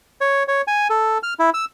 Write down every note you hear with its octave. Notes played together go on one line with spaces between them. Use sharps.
C#5
C#5
G#5
A4
F6
E4
E6